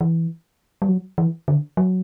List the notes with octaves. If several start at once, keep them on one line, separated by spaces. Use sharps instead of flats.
E3
G3
F#3
E3
D3
F#3